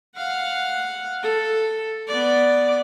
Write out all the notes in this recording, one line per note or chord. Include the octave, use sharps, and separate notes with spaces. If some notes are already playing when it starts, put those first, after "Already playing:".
F5 F#5
A4
B3 D5